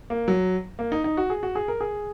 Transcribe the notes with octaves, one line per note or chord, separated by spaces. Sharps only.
A#3
F#3
A#3
D#4
D#4
F#4
G#4
F#4
G#4
A#4
G#4